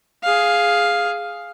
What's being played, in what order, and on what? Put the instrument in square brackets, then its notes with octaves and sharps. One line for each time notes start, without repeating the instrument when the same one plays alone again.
[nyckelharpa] G#4 F5